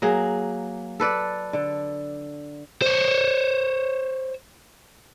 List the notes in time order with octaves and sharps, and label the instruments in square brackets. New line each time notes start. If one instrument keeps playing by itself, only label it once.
[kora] F#3 A#3 G#4
A4 B4 D5
D3
[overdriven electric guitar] C5 C#5